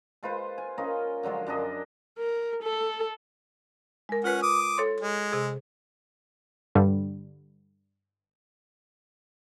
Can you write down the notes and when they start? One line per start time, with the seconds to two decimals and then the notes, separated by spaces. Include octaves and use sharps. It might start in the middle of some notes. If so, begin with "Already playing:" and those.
0.23 G#3 F4 B4 C5
0.58 G#5
0.78 C#4 F4 A#4 D#5
1.23 D3 F3 F#3 G#3
1.47 F#2 D4 G#4 D#5
2.19 A#4
2.63 A4
4.09 G#3 A#4
4.24 C#4 F4 B4 F#5
4.43 D6 D#6
4.78 A4 C#5 C6
5.00 G#3
5.32 C3 G#4
6.75 G2 D3 G3